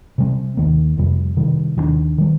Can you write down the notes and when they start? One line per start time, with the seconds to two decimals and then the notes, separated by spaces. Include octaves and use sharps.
0.18 C3 G3 C4
0.57 D#2 D#3 A#3
0.98 F2 C3 G3
1.37 C3 D#3 G3
1.77 D#2 D#3 G3 D4
2.18 D#3 G3